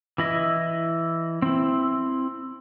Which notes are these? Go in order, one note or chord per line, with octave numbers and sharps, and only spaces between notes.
E3 E4 D#5
C4 E4